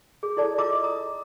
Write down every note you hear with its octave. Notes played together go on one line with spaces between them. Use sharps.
G#4
E4 A4 D5 A5
F4 D#5 A#5 D6 E6
A#5 D#6